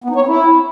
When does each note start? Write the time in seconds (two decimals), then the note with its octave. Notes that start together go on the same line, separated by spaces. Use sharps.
0.04 B3
0.10 D#4
0.15 C#5
0.21 C4
0.27 E4